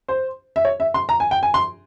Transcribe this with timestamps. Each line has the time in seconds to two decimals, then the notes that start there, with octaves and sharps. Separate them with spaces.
0.08 C5
0.56 E5
0.65 C#5
0.80 E5
0.94 C6
1.09 A#5
1.20 G#5
1.31 G5
1.43 G#5
1.54 C6